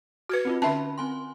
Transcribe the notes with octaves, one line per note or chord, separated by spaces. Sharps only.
F#4 B4 F6 G#6 C#7
C4 D#4 F4
D3 C#4 E5 A5 B5
C4 G#5 C6